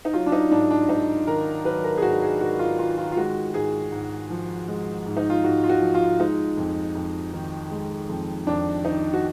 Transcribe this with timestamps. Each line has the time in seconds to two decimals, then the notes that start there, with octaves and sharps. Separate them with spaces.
0.05 D#4
0.13 F#3 F4
0.26 D4
0.32 D#4
0.51 G#2 D4
0.71 D4
0.89 G#2 D#4
1.27 D#3 A#4
1.65 F#3 B4
1.84 A#4
1.97 G#4
2.02 G#2 F#4
2.22 G#4
2.41 G#2 F#4
2.59 F4
2.79 D#3 F4
2.98 F4
3.12 F4
3.17 G#3 F#4
3.54 G#2 G#4
3.92 G#2
4.30 F3
4.68 G#3
5.06 G#2
5.17 D#4
5.30 F4
5.44 G#2 F#4
5.64 F4
5.69 F#4
5.81 F3
5.94 F4
6.19 G#3 D#4
6.57 F2
6.95 F2
7.33 D#3
7.71 G#3
8.09 F2
8.47 F2 D4
8.85 D#3 D#4
9.13 F#4